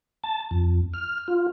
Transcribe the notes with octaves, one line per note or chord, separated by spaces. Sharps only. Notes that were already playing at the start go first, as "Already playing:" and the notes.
A5
F2
F6
F4